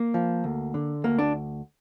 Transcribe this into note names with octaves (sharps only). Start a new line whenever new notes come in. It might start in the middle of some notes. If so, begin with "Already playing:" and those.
Already playing: A#3
F3
D2
D3
D2 A#3
D4